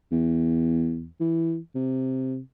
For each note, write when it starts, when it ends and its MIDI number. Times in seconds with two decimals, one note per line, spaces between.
0.12 1.07 40
1.20 1.57 52
1.75 2.39 48